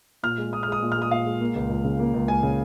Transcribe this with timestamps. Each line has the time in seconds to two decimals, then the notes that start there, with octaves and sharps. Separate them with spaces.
0.23 A#2 F6
0.38 G#3
0.53 A#2 D#6
0.63 F6
0.68 G#3 D#6
0.83 A#2
0.92 F6
0.97 G#3 D#6
1.11 A#2 F5
1.26 G#3
1.41 A#3
1.55 C#2
1.70 C#2
1.84 C#3
1.99 A#3
2.14 C#2
2.28 C#2 G#5
2.43 C#3